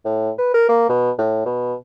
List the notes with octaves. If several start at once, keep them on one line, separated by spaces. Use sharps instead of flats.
A2
B4
A#4
A#3
B2
A2
B2